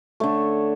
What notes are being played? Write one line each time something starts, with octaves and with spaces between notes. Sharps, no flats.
D3 A3 C#5